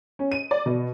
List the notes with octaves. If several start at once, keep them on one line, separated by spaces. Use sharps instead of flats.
C#4
D#7
D5
B2